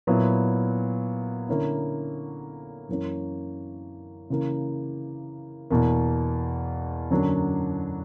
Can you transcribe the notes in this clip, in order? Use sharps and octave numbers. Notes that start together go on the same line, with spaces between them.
A#2 F#3 B3 E4
D3 A#3 C#4 E4
F#2 E3 A#3 C#4
C#3 E3 A#3
E2 B2 A#3
F#2 D3 F#3 A#3 D4